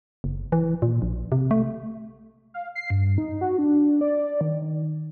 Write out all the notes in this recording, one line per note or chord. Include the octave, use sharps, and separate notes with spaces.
F#1
E3
A#2
A#1
C3
A3
F5
C7
G2
D#4
F#4
D4
D5
D#3